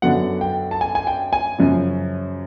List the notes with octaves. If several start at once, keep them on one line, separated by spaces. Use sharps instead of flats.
F#2 D3 F#3 B3 F#5
G5
A5
G#5
G#5
G5
G#5
F#2 C#3 F3